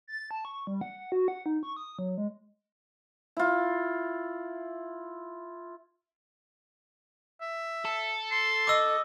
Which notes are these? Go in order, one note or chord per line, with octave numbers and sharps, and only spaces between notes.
A6
A5
C#6
G3
F#5
F#4
F#5
D#4
C#6
D#6
F#3
G#3
E4 F4
E5
A4
C6
D#5 D6 E6